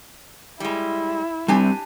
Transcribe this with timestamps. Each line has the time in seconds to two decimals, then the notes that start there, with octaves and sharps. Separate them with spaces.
0.60 G3 G#3 E4
1.48 G3 C4 D4 G4 G#5